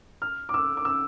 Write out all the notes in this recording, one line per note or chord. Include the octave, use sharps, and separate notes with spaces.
F6
D6
E6
D6
E6